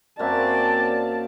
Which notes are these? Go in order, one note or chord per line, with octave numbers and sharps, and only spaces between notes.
F#2 A#3 C4 D5 E5 A5